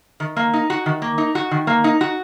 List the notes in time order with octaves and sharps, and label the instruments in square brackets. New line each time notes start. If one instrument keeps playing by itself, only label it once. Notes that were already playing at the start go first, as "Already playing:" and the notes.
[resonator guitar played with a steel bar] D#3
A#3
D#4
F#4
D#3
A#3
D#4
F#4
D#3
A#3
D#4
F#4